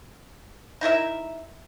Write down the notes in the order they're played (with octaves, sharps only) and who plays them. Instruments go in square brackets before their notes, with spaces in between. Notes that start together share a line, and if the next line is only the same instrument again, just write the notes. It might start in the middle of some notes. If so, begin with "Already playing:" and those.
[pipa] D#4 E4 A#4 E5